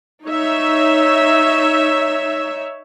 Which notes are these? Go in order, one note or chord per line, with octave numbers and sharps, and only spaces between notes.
D#4 C#5 E5